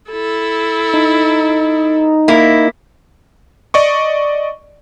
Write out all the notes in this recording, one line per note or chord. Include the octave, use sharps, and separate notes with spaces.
E4 A4
D#4
A#3 E4
D5 D#5 C#6